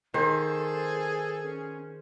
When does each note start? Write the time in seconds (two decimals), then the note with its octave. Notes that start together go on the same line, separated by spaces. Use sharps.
0.14 D#3 G#4 A4 C5
1.44 C#4